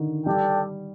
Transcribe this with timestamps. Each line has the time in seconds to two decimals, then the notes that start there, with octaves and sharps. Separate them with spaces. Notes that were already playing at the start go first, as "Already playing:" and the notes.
Already playing: D3 D#3
0.26 G3 D4 A4 D5 G5